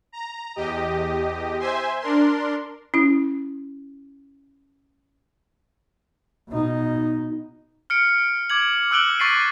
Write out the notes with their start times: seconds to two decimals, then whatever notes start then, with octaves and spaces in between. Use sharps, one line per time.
0.12 A#5
0.56 E2 G4 D#5
1.59 C5 E5 G#5 C6
2.00 D4 A#4 C6
2.94 C#4 E4
6.50 B2 D#4
7.90 F6 C#7 D7
8.50 D6 G#6 F#7
8.91 D6 E6 F#6 D7 F#7 G7
9.20 C#6 A6 B6 C7 D#7